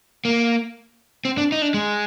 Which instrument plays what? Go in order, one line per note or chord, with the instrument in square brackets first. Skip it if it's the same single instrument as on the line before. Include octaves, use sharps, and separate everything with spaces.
[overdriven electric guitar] A#3
C4
D4
D#4
D4
G#3